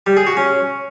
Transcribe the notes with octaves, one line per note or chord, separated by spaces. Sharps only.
G3
G#4
F#4
C#4